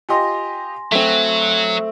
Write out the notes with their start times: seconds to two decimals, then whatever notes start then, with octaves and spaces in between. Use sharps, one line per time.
0.09 F4 G4 D#5 G#5 C6 A#6
0.92 F#3 A3 C4 B6